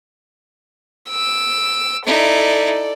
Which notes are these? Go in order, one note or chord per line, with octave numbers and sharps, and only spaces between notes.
E6 D7
D#4 E4 A4 D5